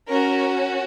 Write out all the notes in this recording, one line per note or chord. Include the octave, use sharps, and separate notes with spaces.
C#4 F#4 A#4